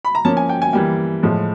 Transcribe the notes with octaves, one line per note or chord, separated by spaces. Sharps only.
B5
A#5
F3 A#3 C#4 A5
G#5
G5
G#5
E3 G3 A#3 G5
A2 F3 G#3